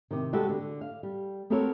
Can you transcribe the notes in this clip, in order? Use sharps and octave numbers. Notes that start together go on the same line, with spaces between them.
C3 D#3
G3 G#3 B3 F#4 G4 A4
D3
F5
G3
B3 C4 F#4 A4 A#4 C#5